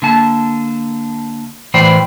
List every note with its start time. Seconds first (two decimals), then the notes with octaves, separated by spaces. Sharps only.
0.02 D3 A#3 A5
1.74 A2 E3 C5 D5 G5